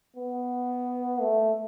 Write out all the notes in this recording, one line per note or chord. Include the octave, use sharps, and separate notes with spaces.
B3
A3